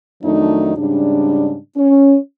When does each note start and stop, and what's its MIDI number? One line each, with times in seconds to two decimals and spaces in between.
0.22 0.75 41
0.22 0.75 51
0.22 0.75 54
0.22 0.75 57
0.22 0.75 62
0.22 0.75 63
0.77 1.56 44
0.77 1.56 49
0.77 1.56 55
0.77 1.56 62
1.77 2.15 61